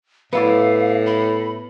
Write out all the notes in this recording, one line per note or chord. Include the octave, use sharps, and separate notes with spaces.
A2 B3 E4 D5 F5
B5